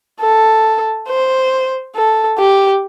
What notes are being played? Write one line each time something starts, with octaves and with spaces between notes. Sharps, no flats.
A4
C5
A4
G4